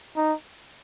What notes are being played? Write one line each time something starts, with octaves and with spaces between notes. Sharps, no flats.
D#4